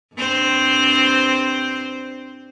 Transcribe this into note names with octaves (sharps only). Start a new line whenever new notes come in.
G2 C4 C5